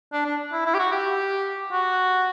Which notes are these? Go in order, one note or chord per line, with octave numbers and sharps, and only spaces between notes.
D4
D4
E4
E4
G4
F#4
G4
F#4